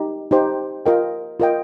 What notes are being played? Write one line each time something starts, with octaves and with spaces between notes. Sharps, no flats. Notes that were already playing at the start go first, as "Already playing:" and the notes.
Already playing: D#4 G4
D#4 G4 C5 G5
F4 A#4 D#5 G5
F4 A#4 D#5 G5